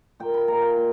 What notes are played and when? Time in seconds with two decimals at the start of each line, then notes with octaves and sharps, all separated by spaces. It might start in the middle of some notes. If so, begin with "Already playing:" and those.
0.20 A#2 A#3 G5
0.34 B5
0.48 A#2 A#3 A#5
0.62 G5
0.76 A#2 A#3